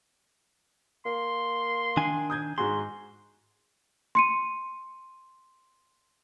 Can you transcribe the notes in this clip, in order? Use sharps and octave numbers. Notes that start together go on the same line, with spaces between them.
A#3 C6
D#3 D4 G#5
D#6 G6 G#6
G#2 F#4 G#4 C6
C6 C#7 D#7